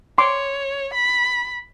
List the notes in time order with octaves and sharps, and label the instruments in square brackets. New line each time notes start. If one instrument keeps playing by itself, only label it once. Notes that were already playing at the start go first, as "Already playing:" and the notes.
[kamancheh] C#5 [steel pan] C6 D6
[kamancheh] B5